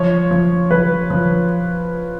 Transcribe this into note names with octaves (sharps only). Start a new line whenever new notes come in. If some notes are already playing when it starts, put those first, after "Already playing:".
Already playing: F3 C#5
F3
F3 B4
F3